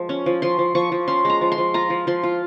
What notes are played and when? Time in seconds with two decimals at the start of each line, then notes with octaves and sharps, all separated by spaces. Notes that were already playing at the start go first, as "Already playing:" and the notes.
Already playing: F3 G#3
0.09 C#4
0.26 F3
0.42 F3 C6
0.59 F3
0.75 F3 C#6
0.92 F3
1.07 C#4 C6
1.25 G#3 A#5
1.41 F3
1.52 C6
1.58 F3
1.74 F4 A#5
1.90 F3
2.07 F3 C6
2.23 F4